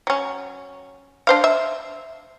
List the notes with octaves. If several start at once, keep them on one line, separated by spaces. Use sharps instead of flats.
F#3 C#4
D4 C5 F5
E5